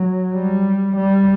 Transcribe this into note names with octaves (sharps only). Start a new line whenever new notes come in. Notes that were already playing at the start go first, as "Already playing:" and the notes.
Already playing: F#3
G3
G3